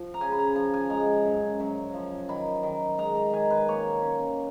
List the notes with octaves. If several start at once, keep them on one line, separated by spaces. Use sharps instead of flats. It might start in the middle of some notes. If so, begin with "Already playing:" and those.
Already playing: F3
A#5
C#3 G#5
B5
A#5
F3 A#5
G#5
G#3 A#5
F#2
F#2
F3
D#3 B5
D#3
G#3 A#5
A#5
D#3 G#5
B4
A#3 C#5
C#4